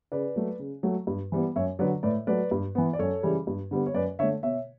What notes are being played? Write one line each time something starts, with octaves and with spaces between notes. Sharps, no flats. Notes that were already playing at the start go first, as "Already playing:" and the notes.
C#3 B4 D5
F#3 A3
C#3
F#3 A3
G2
E3 G3 B3
F#2 C#5 E5
D3 F#3 B4 D5
A2 B4 D5
F#3 A3 B4 D5
G2
E3 B3
D5
F#2 A4 C#5
C#3 E3 G3
G2
D3 G3 B3
C#5
F#2 B4 D5
D3 A3 C#5 E5
B2 C#5 E5